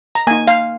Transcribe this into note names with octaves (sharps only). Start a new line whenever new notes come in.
A#5
A#3 D#4 G#5
F5